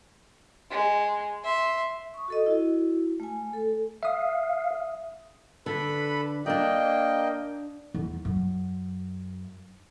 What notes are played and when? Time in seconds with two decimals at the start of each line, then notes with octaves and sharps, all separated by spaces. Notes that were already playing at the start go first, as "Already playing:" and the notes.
0.70 G#3
1.44 E5 C6
2.14 C#6 D#6
2.28 F#4 A4 D#5
2.46 E4 F#4
3.20 A3 G#5
3.53 A4
4.03 E5 F5 D#6
5.66 D3 A4 B4 B5
6.46 A#3 D4 D5 D#5 G5
7.94 E2
8.25 F#2